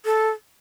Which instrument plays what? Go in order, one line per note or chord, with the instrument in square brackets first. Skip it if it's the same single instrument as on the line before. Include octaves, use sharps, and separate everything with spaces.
[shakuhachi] A4